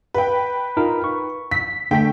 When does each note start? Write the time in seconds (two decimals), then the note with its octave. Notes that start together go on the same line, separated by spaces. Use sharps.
0.14 B4 G5
0.77 D#4 F4 A#4
1.04 C#6
1.51 B6
1.91 D3 A3 A4 G5 B6